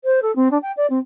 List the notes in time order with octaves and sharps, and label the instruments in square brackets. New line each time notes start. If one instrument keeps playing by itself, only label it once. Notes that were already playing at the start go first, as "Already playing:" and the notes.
[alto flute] C5
A4
C4
D4
G5
D5
C4